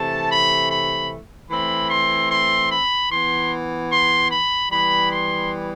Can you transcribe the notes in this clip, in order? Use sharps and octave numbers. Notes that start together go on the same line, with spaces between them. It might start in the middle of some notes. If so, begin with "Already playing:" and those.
Already playing: C3 E3 A3 A5
B5
B5
E3 A3 C4 B5
C6
C6
B5
E3 B3 C6
C6
B5
E3 G3 B3 B5
C6